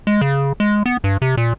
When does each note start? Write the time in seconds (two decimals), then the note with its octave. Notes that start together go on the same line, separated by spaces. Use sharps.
0.07 G#3
0.21 C#3
0.60 G#3
0.86 B3
1.04 G2
1.22 C3
1.37 A#2